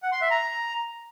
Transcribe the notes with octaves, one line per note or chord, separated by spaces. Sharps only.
F#5
C6
E5
A#5